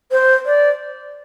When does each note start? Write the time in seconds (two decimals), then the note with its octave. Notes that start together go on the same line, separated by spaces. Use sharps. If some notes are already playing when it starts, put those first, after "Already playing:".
0.11 C5
0.45 D5